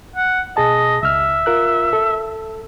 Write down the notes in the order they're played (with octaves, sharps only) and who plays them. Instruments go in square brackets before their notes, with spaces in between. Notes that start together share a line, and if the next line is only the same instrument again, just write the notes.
[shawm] F#5
[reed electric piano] B2 G#4 A5 [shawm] D#5
[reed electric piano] C#2 F6 [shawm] E5
[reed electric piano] F4 A#4 F#6
A4